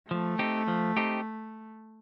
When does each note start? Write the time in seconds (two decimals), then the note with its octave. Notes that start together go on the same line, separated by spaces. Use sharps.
0.10 F3 A3
0.39 C4 D#4 G4
0.68 F3
0.97 C4 D#4 G4